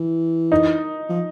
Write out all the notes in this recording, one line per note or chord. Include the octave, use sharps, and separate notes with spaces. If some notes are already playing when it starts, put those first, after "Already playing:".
Already playing: E3
D#4
F3